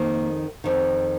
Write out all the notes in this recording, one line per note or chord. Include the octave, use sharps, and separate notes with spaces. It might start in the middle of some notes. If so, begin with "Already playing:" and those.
Already playing: F2 D#3 A#3
F2 D#3